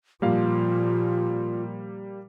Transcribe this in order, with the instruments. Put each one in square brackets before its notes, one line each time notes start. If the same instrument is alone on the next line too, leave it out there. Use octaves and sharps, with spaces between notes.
[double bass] A#2 F3 [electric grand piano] G3 A#3 F5 [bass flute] F4